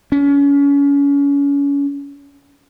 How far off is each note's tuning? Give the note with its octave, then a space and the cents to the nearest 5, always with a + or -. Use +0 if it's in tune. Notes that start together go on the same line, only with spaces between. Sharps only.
C#4 +30